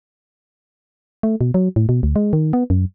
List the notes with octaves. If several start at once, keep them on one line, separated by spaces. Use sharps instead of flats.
A3
B2
F#3
A2
B2
D2
G#3
D#3
B3
F#2